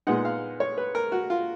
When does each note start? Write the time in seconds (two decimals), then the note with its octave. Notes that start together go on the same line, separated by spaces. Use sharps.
0.07 A#2 G#3 B3 D#4 F#5
0.25 F5
0.60 C#5
0.78 B4
0.95 A#4
1.12 F#4
1.30 F4